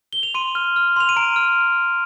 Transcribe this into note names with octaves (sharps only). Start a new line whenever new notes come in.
G7
F7
C6 D#7
F6
F6
C6 F7
D#7
A#5 D7
F6